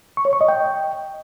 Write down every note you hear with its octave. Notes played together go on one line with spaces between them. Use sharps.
C#6
C#5
C#6
D#5
G5